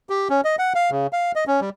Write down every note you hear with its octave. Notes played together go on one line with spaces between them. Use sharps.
G4
C#4
D#5
F#5
F5
C#3
F5
D#5
C#4
G3